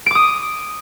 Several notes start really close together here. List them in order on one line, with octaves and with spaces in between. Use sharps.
D7 D6 D#6